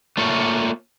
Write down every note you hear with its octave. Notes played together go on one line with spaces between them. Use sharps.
A3 A#3 F4 C#5